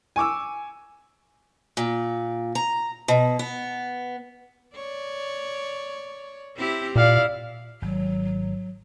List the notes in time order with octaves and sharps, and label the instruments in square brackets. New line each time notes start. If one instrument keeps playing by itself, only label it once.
[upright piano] G#5 C#6 D6 E6
[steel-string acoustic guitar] A#2
A#5
B2
B3
[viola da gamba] C#5 D5
C4 E4 G4
[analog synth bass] A#2 [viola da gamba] E4 [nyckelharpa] D5 F5
[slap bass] G#1 [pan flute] F#3